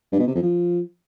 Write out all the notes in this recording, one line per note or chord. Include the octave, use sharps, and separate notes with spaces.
G2
B2
C3
F2
F3